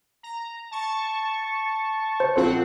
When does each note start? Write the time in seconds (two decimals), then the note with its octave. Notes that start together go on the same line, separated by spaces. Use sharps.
0.23 A#5
0.71 A5 C#6
2.20 C5
2.36 A#1 C4 F4 A4 C5 F#5